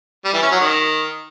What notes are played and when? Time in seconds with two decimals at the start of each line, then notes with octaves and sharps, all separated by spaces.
0.25 G3
0.34 E3
0.43 C#4
0.51 F#3
0.60 D#3